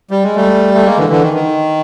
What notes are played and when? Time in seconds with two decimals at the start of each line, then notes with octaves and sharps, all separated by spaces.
0.11 G3
0.24 G#3
0.36 G3 A3
0.74 A3
0.85 G#3 A#3
0.97 D3 E3
1.09 D3 E3
1.22 D#3
1.34 D#3